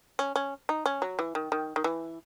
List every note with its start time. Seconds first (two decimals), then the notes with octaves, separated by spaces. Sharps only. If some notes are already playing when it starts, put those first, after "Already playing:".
0.19 C#4
0.36 C#4
0.69 D#4
0.86 C#4
1.02 F#3
1.19 E3
1.35 D#3
1.52 D#3
1.76 D#3
1.84 E3